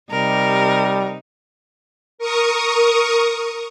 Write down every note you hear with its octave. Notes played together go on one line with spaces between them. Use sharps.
C3 G3 D#4 A#4
A#4 C#6 D#6